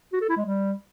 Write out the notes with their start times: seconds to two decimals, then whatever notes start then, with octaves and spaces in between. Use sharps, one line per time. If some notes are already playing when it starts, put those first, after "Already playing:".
0.13 F#4
0.21 A4
0.29 E4
0.37 G#3
0.45 G3